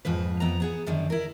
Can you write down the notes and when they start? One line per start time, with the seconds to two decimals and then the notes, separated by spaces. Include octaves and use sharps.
0.05 F2 G#2 F3 B4
0.40 F2 B3 A#5
0.60 B3 G#4 F#5
0.86 F#2 D3 D#3 G3
1.10 E4 A#4